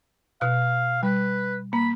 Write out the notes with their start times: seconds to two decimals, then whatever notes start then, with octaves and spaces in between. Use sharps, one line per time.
0.41 B2 F5 F#6
1.03 G3 B4
1.73 A#3 B5